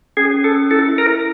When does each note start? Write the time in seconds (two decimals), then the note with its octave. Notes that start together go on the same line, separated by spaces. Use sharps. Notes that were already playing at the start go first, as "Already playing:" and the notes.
0.17 C#4 G#4
0.34 C#4
0.44 A4
0.53 C#4
0.71 E4 A4
0.89 E4
0.98 A#4
1.07 E4